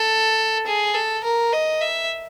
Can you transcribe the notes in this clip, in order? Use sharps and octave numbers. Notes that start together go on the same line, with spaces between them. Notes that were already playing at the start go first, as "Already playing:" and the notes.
Already playing: A4
G#4
A4
A#4
D#5
E5